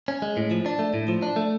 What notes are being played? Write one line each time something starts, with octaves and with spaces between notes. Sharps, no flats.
C#4
G#3
A2
F3
D4
A3
A2
F3
D4
A3